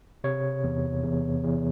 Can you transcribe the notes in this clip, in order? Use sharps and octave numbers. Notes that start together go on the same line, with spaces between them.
C3 C#5
E2
E2
E2